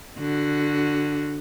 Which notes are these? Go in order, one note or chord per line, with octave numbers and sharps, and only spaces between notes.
D3 F#4